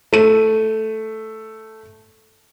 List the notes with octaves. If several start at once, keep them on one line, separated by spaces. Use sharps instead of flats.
A3 D#7